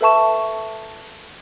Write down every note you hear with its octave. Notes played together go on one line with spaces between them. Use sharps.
A4 B4 E5 A5 C#6 E7